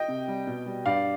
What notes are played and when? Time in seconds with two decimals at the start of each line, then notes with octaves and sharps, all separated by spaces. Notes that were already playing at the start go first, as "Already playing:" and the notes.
Already playing: D#5 G5
0.08 C3
0.28 G3
0.47 B2
0.66 G3
0.86 G2 D5 F5